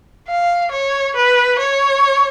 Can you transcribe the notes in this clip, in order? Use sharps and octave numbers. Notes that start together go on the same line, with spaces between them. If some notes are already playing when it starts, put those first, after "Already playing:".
F5
C#5
B4
C#5